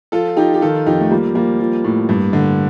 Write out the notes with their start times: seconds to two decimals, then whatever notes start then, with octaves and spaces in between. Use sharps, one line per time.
0.12 F3 F4 A4
0.37 F3 D#4 G4
0.54 G4
0.61 D#3 F4 A4
0.86 F2 D#4 G4
1.00 A3
1.11 F3 G3 A#3
1.35 F3 G3 A#3
1.59 F3
1.84 A2
2.09 G2
2.33 D3